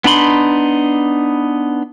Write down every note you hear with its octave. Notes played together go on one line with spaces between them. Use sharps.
B3 D4 D#4 B5 C6